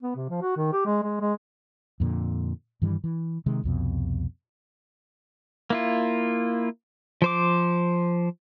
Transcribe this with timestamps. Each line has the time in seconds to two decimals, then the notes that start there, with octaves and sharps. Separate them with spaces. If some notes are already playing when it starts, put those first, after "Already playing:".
0.03 B3
0.16 C3
0.30 F3
0.42 F#4
0.57 D#3
0.73 G4
0.86 G#3
1.04 G#3
1.21 G#3
2.00 F2 A#2 D3
2.82 G2 D#3 E3 G3
3.04 E3
3.46 C3 D#3 G#3
3.63 C2 F2 B2
5.70 A#3 E4 F4
7.22 F3 C5 D6